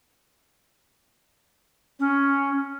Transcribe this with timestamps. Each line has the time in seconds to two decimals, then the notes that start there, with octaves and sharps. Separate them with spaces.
1.99 C#4